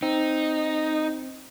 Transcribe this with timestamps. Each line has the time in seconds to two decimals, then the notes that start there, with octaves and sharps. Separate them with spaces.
0.02 C4 D#4